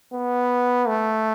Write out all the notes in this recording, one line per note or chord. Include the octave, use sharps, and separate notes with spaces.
B3
A3